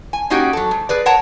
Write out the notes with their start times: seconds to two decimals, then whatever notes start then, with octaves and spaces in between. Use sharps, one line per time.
0.13 G#5
0.30 A#3 C#4 D#4 F#4 G4
0.53 F#3 A4
0.71 G#2
0.89 G#4 B4 D5
1.06 A#4 C#5 F#5 A5 A#5